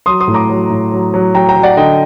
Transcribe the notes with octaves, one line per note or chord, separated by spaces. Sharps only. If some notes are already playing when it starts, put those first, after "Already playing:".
F#3 C6 D#6
C6 D#6
A2
A#5 D6
F#3
A2
F#3
F#3
F#3 G5 A#5
G5 A#5
F#3
D5 F#5
D3 D#5 G5